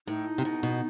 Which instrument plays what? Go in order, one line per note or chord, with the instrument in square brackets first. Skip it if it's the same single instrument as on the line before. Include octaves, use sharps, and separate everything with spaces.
[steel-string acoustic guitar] A2 [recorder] D#4
[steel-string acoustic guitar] C3
B2
B2